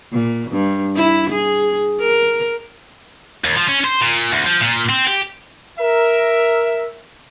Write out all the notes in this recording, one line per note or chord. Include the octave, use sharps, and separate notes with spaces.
A#2
G2
E4
G#4
A#4
D#2
F3
C#4
C5
A#2
D2
F3
A#2
C4
G4
A#4 E5